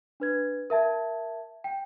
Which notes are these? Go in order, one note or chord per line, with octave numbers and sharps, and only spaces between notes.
D4 B4 G#6
A#4 E5 A5 G#6
G5